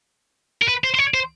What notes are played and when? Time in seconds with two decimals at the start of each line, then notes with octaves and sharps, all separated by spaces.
0.62 A#4
0.68 B4
0.84 C5
0.95 C5
0.99 C#5
1.14 C5